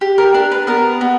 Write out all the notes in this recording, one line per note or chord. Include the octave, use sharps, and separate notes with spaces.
G4
A#4
D4 A#4
B4
B3 A#4
B3